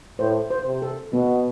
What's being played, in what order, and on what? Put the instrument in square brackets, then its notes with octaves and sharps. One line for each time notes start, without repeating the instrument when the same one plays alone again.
[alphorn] A2 [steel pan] C5
[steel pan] C5
[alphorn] C3
[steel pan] A4
[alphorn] B2 [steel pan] B3